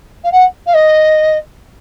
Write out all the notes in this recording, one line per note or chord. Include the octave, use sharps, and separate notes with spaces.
F5
F#5
F5
D#5